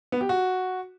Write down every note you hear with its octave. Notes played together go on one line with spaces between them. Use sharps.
B3
G4
F#4